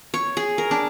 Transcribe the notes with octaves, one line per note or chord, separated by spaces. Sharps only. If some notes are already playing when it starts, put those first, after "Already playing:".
C#5
G#4
A#4
D4